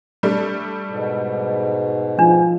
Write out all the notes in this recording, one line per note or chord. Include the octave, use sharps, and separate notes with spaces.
G3 A3 D4
G#2 B2
F3 D4